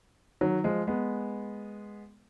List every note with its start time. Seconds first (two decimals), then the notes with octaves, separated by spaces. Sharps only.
0.41 D#3 F#3
0.64 F3 G#3
0.87 G#3 B3